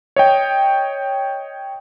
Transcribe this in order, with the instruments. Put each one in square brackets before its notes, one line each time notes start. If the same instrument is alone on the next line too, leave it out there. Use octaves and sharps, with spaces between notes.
[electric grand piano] C#5 D#5 G5